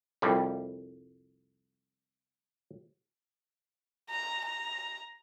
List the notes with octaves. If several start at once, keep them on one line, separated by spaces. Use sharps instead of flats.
C2 F2 G3
A#5
A#5